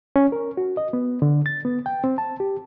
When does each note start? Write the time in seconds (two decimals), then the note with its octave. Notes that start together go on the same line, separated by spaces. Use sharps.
0.16 C#4
0.32 A#4
0.57 F#4
0.77 D#5
0.93 B3
1.22 D3
1.46 A6
1.65 B3
1.86 G5
2.04 C4
2.18 A5
2.40 G4